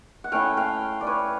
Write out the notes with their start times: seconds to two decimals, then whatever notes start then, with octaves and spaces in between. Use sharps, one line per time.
0.24 F#5
0.32 A3 C#4 E4 F5 G5
0.57 F5 G5
1.01 D5
1.07 B4 C#5